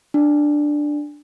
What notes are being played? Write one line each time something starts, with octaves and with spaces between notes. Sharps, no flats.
D4